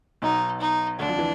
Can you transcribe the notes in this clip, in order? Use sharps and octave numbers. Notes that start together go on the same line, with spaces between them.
B1 B2 D#4
D#4
D2 D3 D4
F2 F3
E3